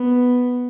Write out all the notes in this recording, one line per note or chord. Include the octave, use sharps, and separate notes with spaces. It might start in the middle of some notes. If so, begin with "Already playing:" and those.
Already playing: B3